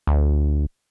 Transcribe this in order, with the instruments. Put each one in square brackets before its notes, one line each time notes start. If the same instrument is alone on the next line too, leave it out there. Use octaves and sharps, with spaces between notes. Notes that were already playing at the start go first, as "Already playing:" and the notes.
[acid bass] D2